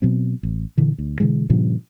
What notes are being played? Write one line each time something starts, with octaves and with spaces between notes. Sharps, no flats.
B2 F#3 C4
A1
A#2 D3 E3
D2
B2 D3 E3 G#3
G2 A#2 C#3 F3